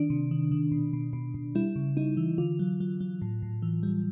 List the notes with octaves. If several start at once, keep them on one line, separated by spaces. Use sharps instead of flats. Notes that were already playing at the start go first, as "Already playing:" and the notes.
Already playing: D#3 D4
C3
D#3
D#3
B2
B2
B2
B2
G3 E4
C#3
G3 D#4
E3
D3 F4
F#3
F#3
F#3
A2
A2
E3
G3